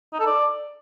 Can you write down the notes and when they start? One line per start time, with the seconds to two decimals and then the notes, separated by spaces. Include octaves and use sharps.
0.13 D#4
0.20 A4
0.27 D5